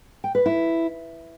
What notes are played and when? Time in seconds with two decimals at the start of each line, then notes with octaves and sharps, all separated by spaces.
0.24 G5
0.35 B4
0.46 E4